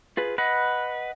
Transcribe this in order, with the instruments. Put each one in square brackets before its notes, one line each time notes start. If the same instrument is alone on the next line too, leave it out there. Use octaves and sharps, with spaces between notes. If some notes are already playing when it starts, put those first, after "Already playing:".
[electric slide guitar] F4 G#4 B4
[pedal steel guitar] B4 [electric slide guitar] D#5 F#5